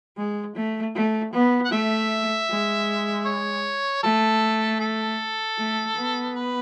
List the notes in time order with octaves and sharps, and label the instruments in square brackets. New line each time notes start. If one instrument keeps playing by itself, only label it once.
[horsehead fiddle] G#3
A3
A3
B3
[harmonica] F#5
[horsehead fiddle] A3 [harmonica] E5
[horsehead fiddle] G#3
[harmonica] C#5
[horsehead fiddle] A3 [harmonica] A4
[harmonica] A4
[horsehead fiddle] A3
B3
[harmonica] B4